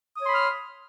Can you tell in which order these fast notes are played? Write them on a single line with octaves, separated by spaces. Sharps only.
D#6 C#5 C6 B5 F6